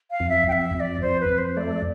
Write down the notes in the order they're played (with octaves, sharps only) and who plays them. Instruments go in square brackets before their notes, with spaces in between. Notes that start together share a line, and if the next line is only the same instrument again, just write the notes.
[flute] F5
[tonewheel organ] F2
[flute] E5
[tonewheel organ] F2 [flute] G5
[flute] E5
[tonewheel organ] F2 [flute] E5
[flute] D5
[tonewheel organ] F2 [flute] C5
[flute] B4
[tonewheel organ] F2
[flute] C5
[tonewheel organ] A3 [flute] D5